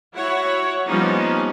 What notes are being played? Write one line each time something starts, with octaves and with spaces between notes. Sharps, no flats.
E4 F#4 C#5 F#5
F3 G3 A#3 B3 C#4 D#4